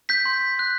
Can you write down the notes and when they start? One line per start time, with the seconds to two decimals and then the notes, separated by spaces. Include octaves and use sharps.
0.09 G6 B6
0.26 C6
0.59 F#6